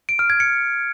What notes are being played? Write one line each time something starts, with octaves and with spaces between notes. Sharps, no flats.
D7
F6
G#6
C#7